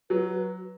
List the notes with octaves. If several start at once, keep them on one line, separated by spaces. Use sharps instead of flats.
F#3 B4